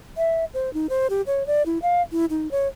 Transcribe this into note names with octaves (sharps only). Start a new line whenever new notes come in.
E5
C5
D#4
C5
G4
C#5
D5
E4
F5
E4
D#4
C#5